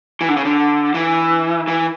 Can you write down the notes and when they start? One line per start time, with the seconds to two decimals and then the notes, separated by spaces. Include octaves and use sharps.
0.21 E3
0.29 D3
0.36 C#3
0.45 D3
0.94 E3
1.68 E3